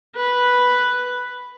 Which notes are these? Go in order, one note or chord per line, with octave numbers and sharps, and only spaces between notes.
B4